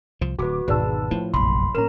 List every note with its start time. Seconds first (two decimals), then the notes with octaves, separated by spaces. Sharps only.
0.21 C2 F3
0.39 D1 F#4 B4 D6
0.68 G#1 E2 G#2 B2 B4 D5 A5 E6
1.11 A2 F3 D4
1.34 F1 A#1 F#2 B5 C6
1.75 A2 F3 A#3 C#4 A#4 A#5 E7